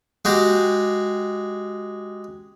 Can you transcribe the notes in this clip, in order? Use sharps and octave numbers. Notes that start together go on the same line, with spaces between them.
G#3 F#4 G4